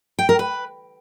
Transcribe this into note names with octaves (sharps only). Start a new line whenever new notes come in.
G5
A#4
B4